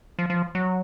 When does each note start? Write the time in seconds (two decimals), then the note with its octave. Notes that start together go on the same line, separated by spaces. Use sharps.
0.19 F3
0.30 F3
0.55 F#3